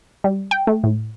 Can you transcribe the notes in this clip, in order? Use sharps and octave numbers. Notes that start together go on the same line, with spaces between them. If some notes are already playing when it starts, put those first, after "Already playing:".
G3
G5
A3
A2